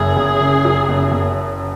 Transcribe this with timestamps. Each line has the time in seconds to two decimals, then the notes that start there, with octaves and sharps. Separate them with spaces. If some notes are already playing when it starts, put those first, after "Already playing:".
Already playing: F#1 F#2 G#4
0.17 F#1
0.41 C#3
0.65 F#2
0.88 F#1
1.12 F#1